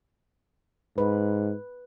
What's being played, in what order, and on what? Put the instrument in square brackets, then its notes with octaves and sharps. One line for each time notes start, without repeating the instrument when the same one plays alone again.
[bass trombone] G#2 [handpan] B4